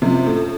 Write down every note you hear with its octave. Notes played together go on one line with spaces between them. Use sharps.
F#1 F#2 C3 F3
A2